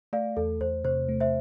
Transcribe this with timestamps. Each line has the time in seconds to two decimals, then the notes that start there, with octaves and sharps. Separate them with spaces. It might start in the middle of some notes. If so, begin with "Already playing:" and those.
0.13 A3 D5 F5
0.37 E2 A4
0.60 E2 C5
0.84 C3 C5
1.09 A3
1.20 C5 E5